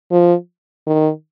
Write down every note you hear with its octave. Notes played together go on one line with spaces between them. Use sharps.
F3
D#3